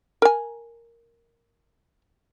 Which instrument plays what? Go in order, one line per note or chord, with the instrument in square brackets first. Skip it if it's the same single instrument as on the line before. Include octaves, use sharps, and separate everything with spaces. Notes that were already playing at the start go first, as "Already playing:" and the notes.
[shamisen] A#4 G#5